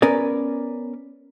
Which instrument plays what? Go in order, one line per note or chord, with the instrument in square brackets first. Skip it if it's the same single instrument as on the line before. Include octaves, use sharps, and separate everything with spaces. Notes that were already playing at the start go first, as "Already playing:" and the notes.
[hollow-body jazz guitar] B3 C#4 A#4 B4 D5